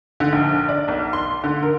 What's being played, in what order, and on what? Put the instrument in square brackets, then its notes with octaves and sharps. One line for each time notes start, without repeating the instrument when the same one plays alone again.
[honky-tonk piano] D3
A#1
D5
B1
C6
D3
A#4